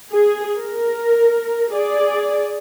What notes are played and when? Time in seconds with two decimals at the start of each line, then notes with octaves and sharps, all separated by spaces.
0.13 G#4
0.60 A#4
1.74 G#4 D5